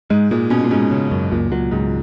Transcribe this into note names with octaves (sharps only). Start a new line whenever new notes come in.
G#2 G#3
A#2 G#3
B2 C#4
A#2
G#2 C#4
C#3
F#2
C#2 A#2
A#2 F#3
C#2 G#2